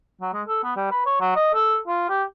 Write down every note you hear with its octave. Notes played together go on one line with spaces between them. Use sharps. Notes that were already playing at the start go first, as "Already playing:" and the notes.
F#3
G#3
A4
B3
G3
B4
C#5
F#3
D#5
A4
F4
G4